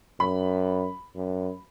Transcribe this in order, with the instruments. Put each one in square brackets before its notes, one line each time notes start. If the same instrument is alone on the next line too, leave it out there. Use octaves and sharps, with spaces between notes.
[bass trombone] F#2 [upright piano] B5
[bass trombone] F#2